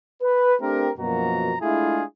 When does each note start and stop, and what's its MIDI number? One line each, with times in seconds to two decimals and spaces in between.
0.22 0.55 71
0.61 0.90 57
0.61 0.90 60
0.61 0.90 62
0.61 0.90 67
0.61 0.90 70
0.98 1.55 42
0.98 1.55 47
0.98 1.55 53
0.98 1.55 58
0.98 1.55 66
0.98 1.55 82
1.62 2.03 56
1.62 2.03 57
1.62 2.03 62
1.62 2.03 64
1.62 2.03 65
1.62 2.03 68